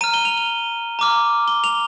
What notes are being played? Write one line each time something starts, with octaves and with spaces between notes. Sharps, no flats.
A#5 F6 D#7
G7
F7
G7
A#5 D6 F6
G7
F7